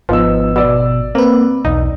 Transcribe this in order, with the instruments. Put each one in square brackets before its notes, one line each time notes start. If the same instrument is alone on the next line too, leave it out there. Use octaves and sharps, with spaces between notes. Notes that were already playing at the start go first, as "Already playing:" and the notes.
[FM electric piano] G#1 [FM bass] F3 [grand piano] B3 D#4 E6
[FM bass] B2 [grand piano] D5 E6
[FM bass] A#3 [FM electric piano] C4 B4
[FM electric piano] B1 E2 [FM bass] D#4